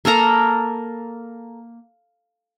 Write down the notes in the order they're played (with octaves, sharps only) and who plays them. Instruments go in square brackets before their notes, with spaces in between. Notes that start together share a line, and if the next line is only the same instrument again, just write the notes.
[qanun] A#3 A4 A#4 A#5